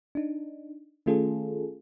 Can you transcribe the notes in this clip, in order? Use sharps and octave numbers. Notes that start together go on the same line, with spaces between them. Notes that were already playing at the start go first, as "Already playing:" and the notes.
D4 D#4
D#3 A3 C#4 F4 G#4 A4